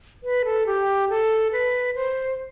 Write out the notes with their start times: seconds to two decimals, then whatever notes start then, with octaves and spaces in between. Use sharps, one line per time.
0.23 B4
0.45 A4
0.67 G4
1.09 A4
1.52 B4
1.95 C5